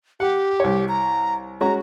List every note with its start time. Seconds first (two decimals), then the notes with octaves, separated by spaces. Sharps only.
0.20 G4 F#5
0.60 C2 C#5
0.88 A#5
1.61 G#3 C#4 F#4 A#5